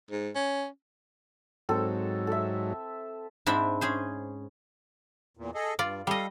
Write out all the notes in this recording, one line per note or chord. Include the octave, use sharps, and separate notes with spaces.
G#2
C#4
G#2 F#3 C4 A4
A4 E5
G#2 C4 D4 E4 E5 B5
C#4 G#4 C5
E2 A#2
G#4 A4 D#5
G2 F4 D5
G3 A4 D#5 F5